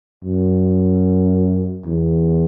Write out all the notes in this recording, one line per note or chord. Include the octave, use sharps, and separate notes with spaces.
F#2
E2